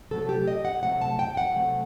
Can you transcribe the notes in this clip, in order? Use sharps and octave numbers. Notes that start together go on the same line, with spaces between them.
C3 F#3 A3 A4
G4
D#5
F#5
C3 F#3 A3 F#5
A5
G5
F#5
C3 F#3 A3